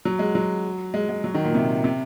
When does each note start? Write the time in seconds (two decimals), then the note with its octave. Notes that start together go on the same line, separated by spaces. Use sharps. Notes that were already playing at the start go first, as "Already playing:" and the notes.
0.05 F#3
0.19 G#3
0.35 F#3
0.94 G#3
1.09 G#3
1.24 F#3
1.34 D#3
1.45 A#2
1.55 C3
1.84 C3